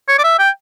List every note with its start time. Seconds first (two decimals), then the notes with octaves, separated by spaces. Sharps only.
0.08 C#5
0.19 D5
0.24 E5
0.39 G5